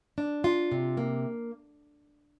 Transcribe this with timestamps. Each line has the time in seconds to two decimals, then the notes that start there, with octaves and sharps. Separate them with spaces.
0.18 D4
0.44 F4
0.72 C3
0.97 A#3